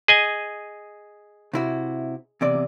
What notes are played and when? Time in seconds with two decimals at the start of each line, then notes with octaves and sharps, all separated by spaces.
0.08 G#4 D#5 G#5
1.53 C3 E4 F#4
2.41 E2 C3 D5